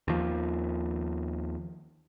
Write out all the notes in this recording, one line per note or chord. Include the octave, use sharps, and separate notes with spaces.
D#2 F3